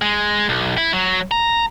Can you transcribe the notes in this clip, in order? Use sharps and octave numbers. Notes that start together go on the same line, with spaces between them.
G#3
B1
E4
F#3
A#5